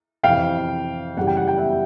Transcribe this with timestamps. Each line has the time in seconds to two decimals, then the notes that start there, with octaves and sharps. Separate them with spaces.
0.23 F2 C3 E3 F5 G5
1.17 F#2 C#3 E3 G3 F#5
1.27 G5
1.37 F#5
1.48 G5
1.58 E5 F#5